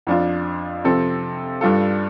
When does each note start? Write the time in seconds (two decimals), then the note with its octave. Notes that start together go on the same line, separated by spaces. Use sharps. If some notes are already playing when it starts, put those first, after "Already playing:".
0.07 F2 F3 D4 F4
0.84 C3 F3 C4 A4
1.61 G2 G3 D4 F4 A4